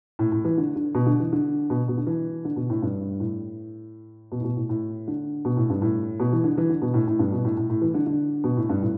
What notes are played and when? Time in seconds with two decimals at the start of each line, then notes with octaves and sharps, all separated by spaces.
0.19 A2
0.32 A2
0.45 E3
0.58 D3
0.76 D3
0.95 B2
1.06 D3
1.20 E3
1.33 D3
1.70 B2
1.88 B2
1.97 D3
2.07 E3
2.45 D3
2.56 B2
2.70 A2
2.82 G2
3.20 A2
4.32 B2
4.40 A2
4.44 B2
4.57 A2
4.69 A2
5.08 D3
5.45 B2
5.57 A2
5.70 G2
5.82 A2
6.20 B2
6.32 E3
6.44 D3
6.58 E3
6.69 D3
6.82 B2
6.94 A2
7.07 A2
7.19 G2
7.32 B2
7.45 A2
7.57 A2
7.70 A2
7.81 E3
7.94 D3
8.07 D3
8.44 B2
8.57 A2
8.69 G2
8.82 A2